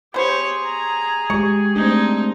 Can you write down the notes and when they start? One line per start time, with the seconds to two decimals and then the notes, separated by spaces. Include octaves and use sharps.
0.14 B3 G4 G#4 C5 C#5
0.63 A#5
1.30 G#3 G4 C#6
1.75 A3 C4 D4 D#4